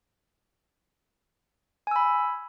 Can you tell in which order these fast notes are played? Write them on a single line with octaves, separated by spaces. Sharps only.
G#5 E6 B5